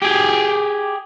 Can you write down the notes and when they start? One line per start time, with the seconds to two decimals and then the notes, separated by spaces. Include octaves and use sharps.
0.02 G4 G#4